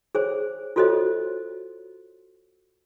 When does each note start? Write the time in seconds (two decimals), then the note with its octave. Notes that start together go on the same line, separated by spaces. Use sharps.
0.15 G#4 C5 C#5
0.76 F4 F#4 A4 C5 C#5 D#5